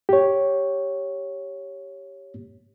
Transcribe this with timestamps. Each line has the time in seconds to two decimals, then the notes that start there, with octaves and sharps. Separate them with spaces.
0.09 G4 C#5